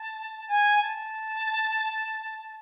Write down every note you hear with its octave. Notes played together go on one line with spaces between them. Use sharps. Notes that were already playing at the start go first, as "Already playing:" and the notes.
Already playing: A5
G#5
A5